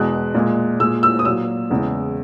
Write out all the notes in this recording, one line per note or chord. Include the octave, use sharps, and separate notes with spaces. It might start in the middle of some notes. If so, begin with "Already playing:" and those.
Already playing: E2 B2 G#3 F#6
A#2 G#3
A#2 G#3 E6
E6
D#6
A#2 F#3 E6
E2 C#3 G#3